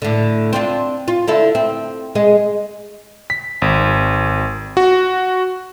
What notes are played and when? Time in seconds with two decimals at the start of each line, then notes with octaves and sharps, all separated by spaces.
0.02 A2 D3
0.53 C4 D4 F4
1.08 F4
1.28 D3 E4 A4
1.55 C4
2.15 G#3 G#4 D#5
3.30 B6
3.62 G#1
4.77 F#4